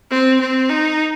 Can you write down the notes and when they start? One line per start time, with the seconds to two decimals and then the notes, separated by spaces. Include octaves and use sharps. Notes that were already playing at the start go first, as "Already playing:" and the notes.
0.10 C4
0.40 C4
0.69 D#4